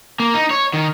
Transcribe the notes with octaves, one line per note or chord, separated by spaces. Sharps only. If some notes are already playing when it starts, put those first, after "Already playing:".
A#3
D#4
C#5
D#3